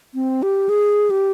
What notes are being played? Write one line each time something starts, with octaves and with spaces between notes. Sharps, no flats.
C4
G4
G#4
G4